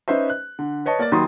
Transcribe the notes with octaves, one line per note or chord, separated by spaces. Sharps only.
C#4 D#4 B4 C5 E5
F#6
D3
B4 C#5 D#5 A5
A#3 D5 A6
D#2 D#3 F#3 B5 C6 D#6